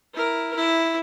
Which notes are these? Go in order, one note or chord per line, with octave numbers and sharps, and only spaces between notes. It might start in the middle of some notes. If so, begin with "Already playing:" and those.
E4 A#4
E4